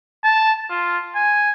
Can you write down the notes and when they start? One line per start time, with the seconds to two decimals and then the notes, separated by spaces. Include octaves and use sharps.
0.24 A5
0.70 F4
1.15 G#5